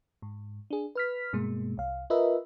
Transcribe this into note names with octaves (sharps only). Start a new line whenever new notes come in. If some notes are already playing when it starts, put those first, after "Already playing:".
G#2
D4 G#4
B4 F6 B6
G2 B2 G#3 A#3
C2 F5
F4 A#4 B4 D#5 E5